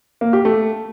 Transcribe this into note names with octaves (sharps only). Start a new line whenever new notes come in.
A#3
G4
A3